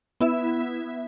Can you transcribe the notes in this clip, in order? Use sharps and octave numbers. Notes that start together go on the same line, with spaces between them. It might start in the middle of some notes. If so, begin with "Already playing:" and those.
B3 E4 E5